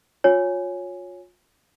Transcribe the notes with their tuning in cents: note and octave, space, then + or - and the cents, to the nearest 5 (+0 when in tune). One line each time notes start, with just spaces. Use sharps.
F4 +35 C#5 +0 G#5 +0